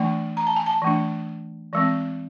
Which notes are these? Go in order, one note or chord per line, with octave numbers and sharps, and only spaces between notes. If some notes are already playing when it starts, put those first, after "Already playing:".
Already playing: E3 A3 D4 G#5
A#5
A5
G#5
A5
E3 A3 D4
E3 G#3 C4